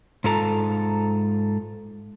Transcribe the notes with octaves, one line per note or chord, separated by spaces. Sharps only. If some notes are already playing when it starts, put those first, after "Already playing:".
G#2 F4 A4 A#5